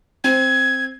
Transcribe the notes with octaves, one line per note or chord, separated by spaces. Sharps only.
C4 G#6